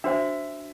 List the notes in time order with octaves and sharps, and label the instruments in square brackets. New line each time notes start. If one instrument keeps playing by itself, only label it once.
[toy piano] D4 F#4 C5 [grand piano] E5